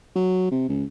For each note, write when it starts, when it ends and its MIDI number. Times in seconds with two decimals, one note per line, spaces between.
0.15 0.50 54
0.51 0.65 48
0.69 0.84 37